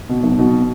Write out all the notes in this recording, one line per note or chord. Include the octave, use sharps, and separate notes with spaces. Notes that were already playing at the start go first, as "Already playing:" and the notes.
B2
B1
B2